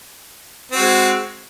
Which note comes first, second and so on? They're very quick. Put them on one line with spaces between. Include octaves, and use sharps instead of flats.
C4 F#4 G#3